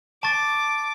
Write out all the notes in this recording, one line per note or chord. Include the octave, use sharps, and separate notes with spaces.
A5 C#6 D6 A6